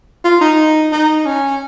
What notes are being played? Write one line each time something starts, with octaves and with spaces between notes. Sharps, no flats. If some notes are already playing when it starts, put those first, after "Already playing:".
F4
D#4
D#4
C#4